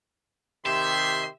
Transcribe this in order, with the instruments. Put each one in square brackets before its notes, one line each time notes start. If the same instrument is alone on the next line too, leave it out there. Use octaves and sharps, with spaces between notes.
[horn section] C3 D#3 C6 [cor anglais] G4 [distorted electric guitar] E5